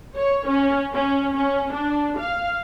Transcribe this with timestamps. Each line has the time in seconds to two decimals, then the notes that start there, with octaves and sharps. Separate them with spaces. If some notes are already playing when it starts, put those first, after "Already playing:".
0.16 C#5
0.46 C#4
0.94 C#4
1.35 C#4
1.73 D4
2.18 F5